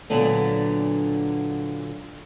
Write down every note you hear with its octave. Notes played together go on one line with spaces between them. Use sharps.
A#2 D3 F#3 B3 D4